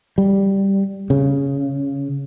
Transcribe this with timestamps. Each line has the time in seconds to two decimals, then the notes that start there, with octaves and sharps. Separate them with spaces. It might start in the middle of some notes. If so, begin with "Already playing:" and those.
0.18 G3
1.10 C#3